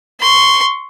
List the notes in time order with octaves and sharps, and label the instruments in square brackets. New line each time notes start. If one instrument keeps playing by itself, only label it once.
[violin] C6 C#6